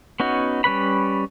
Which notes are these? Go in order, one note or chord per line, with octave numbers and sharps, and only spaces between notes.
B3 C#4 D#4 F#4
G3 C#4 B4 B5